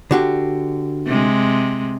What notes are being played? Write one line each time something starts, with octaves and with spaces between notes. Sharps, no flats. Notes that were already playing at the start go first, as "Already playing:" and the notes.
D3 F#4 G4
C3 G#3